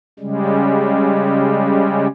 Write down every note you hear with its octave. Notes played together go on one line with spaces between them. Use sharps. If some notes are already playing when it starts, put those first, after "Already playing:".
C#3 G3 G#3